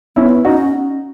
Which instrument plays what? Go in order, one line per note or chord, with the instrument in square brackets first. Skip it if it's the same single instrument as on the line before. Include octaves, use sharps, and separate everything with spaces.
[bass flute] B3 [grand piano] C#4 E4
[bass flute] C#4 [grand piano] D#4 F#4